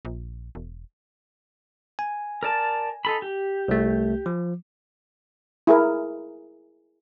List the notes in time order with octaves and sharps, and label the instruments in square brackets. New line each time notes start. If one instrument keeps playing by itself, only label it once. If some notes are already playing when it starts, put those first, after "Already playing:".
[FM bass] A#1
E1
[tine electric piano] G#5
[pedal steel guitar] A#4 D5 A5
D#4 A4 B5
G4
[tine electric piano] C2 A3
F3
[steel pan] E4 G#4 A#4